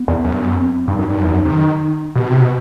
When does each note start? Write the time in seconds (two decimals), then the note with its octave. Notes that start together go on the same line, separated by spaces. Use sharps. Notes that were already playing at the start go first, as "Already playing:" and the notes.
Already playing: B3
0.08 E2
0.24 F#2
0.33 G2
0.42 F#2
0.56 C4
0.88 G2 D#4
0.99 F#2
1.09 G2
1.17 F#2
1.24 E2
1.32 F#2
1.45 C3
1.52 D#3
2.15 B2 G4
2.27 C3 F#4
2.37 B2 F#4